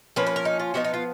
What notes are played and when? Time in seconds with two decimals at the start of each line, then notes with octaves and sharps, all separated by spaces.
0.16 F3 A#3 C#4 B4
0.26 B4
0.36 A#4
0.45 D#4
0.59 F4
0.74 F3 B3 D#4 F#4
0.84 D#4
0.94 F4